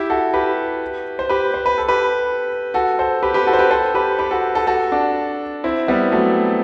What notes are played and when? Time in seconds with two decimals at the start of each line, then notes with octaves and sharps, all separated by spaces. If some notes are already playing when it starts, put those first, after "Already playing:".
Already playing: E4 G4
0.10 F#4 A4
0.34 G4 B4
1.19 C5
1.29 G4 B4
1.54 C5
1.66 B4
1.78 A4
1.88 G4 B4
2.74 F#4 A4
2.99 A4 C5
3.23 G4 B4
3.34 G4 B4
3.47 F#4 A4
3.53 C5
3.59 G4 B4
3.71 A4 C5
3.95 G4 B4
4.19 G4 B4
4.31 F#4 A4
4.55 F#4 A4
4.67 F#4 A4
4.92 D4 F#4
5.64 C4 E4
5.88 G3 B3
6.12 F#3 A3